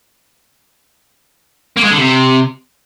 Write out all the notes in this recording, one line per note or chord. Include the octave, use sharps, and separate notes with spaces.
A#3
G#3
D3
C3